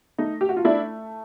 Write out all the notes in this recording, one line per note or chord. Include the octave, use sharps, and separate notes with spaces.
A3 D#4
G4
F#4
F4
A3 D4 E4